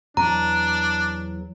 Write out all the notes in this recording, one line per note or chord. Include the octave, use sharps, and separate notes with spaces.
E2 F#3 D4 A#5